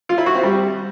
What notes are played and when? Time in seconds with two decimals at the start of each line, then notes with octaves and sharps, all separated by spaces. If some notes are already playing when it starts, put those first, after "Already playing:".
0.09 F4
0.18 E4
0.26 F#4
0.35 C4
0.43 G3